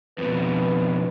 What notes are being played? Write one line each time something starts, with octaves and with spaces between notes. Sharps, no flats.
F2 B2 B4